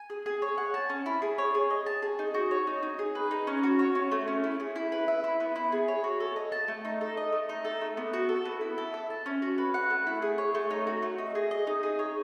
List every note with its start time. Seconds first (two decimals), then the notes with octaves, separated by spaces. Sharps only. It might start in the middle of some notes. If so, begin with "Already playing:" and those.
Already playing: G#5
0.10 G#4
0.26 G#4
0.42 C#5
0.58 F#5
0.74 A5
0.90 C#4
1.06 E4
1.22 G#4
1.38 C#5
1.55 G#4
1.70 D#5
1.86 A5
2.02 G#4
2.19 D#4
2.34 F#4
2.51 C#5
2.67 D#4
2.83 D#4
2.99 G#4
3.15 B4
3.31 D#4
3.47 C#4
3.63 F#4
3.79 C#5
3.95 C#4
4.11 A3
4.27 C#4
4.44 E4
4.60 G#4
4.76 E4
4.92 B4
5.08 E5
5.24 E4
5.40 B3
5.56 E4
5.72 G#4
5.88 C#5
6.04 F#4
6.20 A4
6.36 D#5
6.52 A5
6.68 A3
6.85 D#4
7.01 A4
7.17 D#5
7.32 A3
7.49 D#4
7.65 A4
7.81 A3
7.97 B3
8.13 F#4
8.29 A4
8.45 B3
8.61 E4
8.78 A4
8.94 E5
9.10 A5
9.26 C#4
9.42 F#4
9.58 B4
9.74 F#5
9.90 A3
10.07 E4
10.22 G#4
10.38 C#5
10.55 A3
10.71 D#4
10.87 F#4
11.02 A3
11.18 D#4
11.35 G#4
11.51 D#5
11.67 D#4
11.83 G#4
11.99 C#5